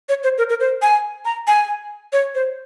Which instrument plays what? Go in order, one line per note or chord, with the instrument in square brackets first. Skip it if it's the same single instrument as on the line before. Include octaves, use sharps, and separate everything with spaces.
[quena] C#5
C5
A#4
A#4
C5
G#5
A#5
G#5
C#5
C5